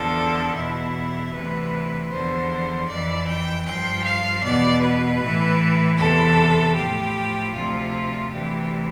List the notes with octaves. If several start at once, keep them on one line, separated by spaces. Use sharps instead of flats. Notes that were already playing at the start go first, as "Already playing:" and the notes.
Already playing: E2 D3 F3 A4
E2 B2 E4
D2 C3 E3 B4
E2 D3 F3 C5
F2 E3 D5
G5
G2 F3 G5
F5
E2 B2 D5
B4
A2 E3
E2 C3 E3 A4
A2 F3 G4
D2 C3 F3 F4
D2 C3 E3 G4